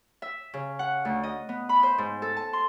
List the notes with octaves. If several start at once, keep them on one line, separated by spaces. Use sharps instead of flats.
E5
C#3
F#5
D2
D#5
B3
B5
C5
G#2
A4
A5
C6